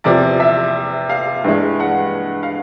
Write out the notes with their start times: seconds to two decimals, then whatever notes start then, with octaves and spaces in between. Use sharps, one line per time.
0.04 E2 C3 F3 D5
0.40 E5
1.09 F5
1.44 G2 E3 G#3
1.80 F#5
2.43 F5